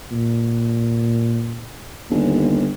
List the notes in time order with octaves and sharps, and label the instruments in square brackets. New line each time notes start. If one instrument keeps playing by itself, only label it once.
[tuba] A#2
[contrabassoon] G1 [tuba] D#2